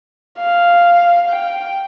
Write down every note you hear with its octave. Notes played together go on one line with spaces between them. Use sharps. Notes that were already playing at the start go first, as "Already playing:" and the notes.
F5
G5